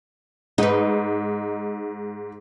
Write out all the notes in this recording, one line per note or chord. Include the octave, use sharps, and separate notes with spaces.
G#2 D#4 B4